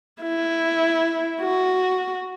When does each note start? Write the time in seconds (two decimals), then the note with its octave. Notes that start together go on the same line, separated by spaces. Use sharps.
0.22 E4
1.42 F#4